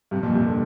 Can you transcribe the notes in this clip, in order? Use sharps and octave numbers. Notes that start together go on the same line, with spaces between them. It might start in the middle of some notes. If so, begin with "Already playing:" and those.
G2 C3
F2 A#2
G2 C3
A#2 D3